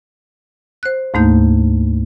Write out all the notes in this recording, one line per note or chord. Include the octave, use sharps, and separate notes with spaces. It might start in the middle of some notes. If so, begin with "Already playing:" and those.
C5 F#6
D2 G#2 A3 A#3 D#4 G6